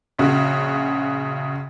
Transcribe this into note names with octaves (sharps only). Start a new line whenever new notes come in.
A#1 C#3 F#4